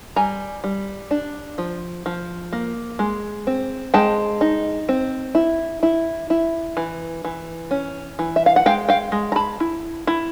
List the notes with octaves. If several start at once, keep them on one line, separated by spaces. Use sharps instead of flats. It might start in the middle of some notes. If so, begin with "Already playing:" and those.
G3 G#5 A#5
G3
D4
F3
F3
A#3
G#3
C4
G#3 G5 A5
D#4
C4
E4
E4
E4
E3
E3
C#4
E3
E5
F5
F#5
G#3 F5 G5
F5 G5
G#3
A#5
A5 B5
E4
E4